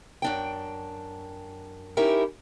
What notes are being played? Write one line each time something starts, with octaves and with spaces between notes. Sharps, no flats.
F#2 D4 G5
C#4 D#4 E4 G4 A#4